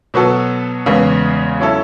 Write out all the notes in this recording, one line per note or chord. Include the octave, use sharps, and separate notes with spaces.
B2 F#3 B3 F#4 A4
E2 C#3 G#3 B3
F#3 C#4 E4 A4